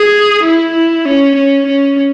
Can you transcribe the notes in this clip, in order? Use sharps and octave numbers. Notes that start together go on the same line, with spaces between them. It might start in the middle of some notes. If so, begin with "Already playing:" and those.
Already playing: G#4
E4
E4
C#4
C#4
C#4